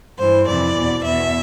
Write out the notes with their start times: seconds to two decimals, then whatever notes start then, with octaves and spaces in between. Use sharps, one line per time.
0.19 G2 E3 C5
0.47 F2 C3 E3 D5
0.76 E2 B2
1.04 E2 B2 E5